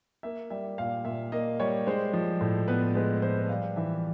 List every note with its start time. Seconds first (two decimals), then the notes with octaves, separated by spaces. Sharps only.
0.23 A#3 E5
0.50 G3 E5
0.78 A#2 F5
1.05 A#2 E5
1.32 A#3 D#5
1.60 G3 C#5
1.87 G#3 C5
2.13 F3
2.41 A2
2.68 B3 B4
2.95 G#3 B4
3.22 F3 C5
3.49 G3 F5
3.76 E3 E5